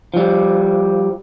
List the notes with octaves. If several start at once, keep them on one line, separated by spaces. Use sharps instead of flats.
F3 G3